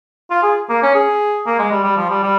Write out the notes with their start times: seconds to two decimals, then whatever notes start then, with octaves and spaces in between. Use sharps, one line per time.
0.31 F4
0.43 G#4
0.69 A#3
0.83 C#4
0.95 G#4
1.47 A#3
1.59 G#3
1.71 G3
1.84 G3
1.97 F3
2.10 G3
2.23 G3